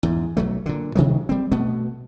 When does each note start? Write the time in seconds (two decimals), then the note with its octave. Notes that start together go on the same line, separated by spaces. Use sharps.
0.03 E2 G#2
0.37 B1 F#3 A3
0.66 A#2 D3
0.95 C3 D#3 F#3 G#3
1.29 G3 C4
1.51 B2 A3 B3